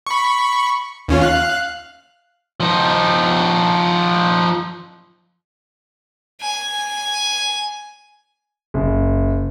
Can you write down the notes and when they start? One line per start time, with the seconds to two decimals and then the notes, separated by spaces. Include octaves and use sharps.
0.07 B5 C#6
1.08 D#2 C#4 F4
1.21 F5 F#6
2.60 F3 D#4
6.41 G#5
8.74 F#1